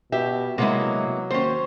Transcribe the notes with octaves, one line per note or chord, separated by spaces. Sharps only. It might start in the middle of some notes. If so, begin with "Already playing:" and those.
B2 G4 E5
C3 F#3 G#3 A#3 B3 E4
D#2 C#4 C5